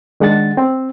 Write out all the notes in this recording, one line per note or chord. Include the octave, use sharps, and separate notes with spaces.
D#3 G#3 D4 F#5 A6
C4